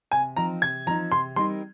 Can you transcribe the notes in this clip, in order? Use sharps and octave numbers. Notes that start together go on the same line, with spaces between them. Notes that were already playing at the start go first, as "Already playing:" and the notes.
C3 G#5
F3 C4 D#4 A#5
C3 G#6
F3 C4 D#4 A#5
C3 C6
G3 C4 D#4 A#4 C6